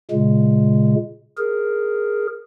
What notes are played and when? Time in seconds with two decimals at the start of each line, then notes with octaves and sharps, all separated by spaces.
0.11 A#2 C#3 G#3
1.38 G#4 A#4